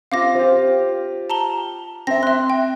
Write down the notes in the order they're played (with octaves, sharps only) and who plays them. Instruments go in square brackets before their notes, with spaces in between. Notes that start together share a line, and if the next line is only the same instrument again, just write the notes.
[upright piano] C4 F4 [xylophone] F5 D6 A#6
[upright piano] F4 G4 [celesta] C5
[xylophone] A5 A#5 G7
[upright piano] C4 [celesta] E5 G5 [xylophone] A#6
[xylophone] E5 C6 [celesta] F#6
[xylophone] G5